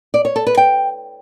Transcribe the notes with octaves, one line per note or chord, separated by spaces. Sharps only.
D5
C#5
A4
B4
G5